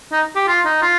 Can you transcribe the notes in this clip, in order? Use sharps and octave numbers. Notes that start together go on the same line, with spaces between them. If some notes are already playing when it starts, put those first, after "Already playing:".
D#4
G4
F4
D#4
F4